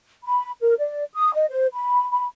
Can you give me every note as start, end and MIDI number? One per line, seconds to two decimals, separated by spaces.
0.25 0.51 83
0.61 0.78 70
0.78 1.04 74
1.13 1.31 87
1.34 1.46 75
1.50 1.67 72
1.73 2.09 83
2.10 2.24 83